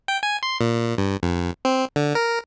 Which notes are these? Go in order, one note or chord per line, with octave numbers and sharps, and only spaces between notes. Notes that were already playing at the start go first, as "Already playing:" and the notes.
G5
G#5
C6
A#2
G2
F2
C4
D3
A#4